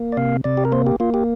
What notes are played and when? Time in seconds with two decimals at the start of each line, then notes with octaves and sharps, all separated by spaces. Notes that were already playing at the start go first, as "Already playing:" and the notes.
Already playing: A#3
0.12 D5
0.17 C3 F5
0.44 C3 D5
0.57 G4
0.65 A#4
0.72 A#3 C5
0.87 G4
1.00 A#3 F4
1.14 G4